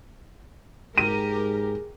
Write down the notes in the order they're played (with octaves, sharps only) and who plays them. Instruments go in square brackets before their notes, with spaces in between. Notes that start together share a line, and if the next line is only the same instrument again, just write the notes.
[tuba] G#2 [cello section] G4 A#4 [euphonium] G#4 [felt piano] D#7